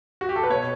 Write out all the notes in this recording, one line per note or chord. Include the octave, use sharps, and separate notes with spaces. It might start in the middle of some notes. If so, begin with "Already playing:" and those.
F#4
G4
A4
B4
B2 C#5